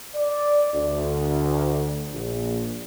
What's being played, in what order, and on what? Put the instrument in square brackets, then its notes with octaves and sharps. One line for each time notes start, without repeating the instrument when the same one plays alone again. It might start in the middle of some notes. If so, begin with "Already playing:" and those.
[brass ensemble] D5
D2
A#1